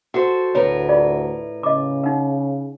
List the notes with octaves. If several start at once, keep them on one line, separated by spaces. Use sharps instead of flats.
F#4 A4 C5 F#5
D2 A2 A#4 B4 C#5
F4 G#4 D5
C#3 D#5 D6
D#4 F#5